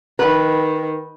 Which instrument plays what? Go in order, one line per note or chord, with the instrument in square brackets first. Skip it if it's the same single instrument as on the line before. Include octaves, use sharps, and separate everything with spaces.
[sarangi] D#3 [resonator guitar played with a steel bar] B4